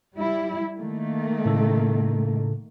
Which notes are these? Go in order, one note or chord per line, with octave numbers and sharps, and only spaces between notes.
G3 E4
D#3 A3 A#3
A2 C#3 A4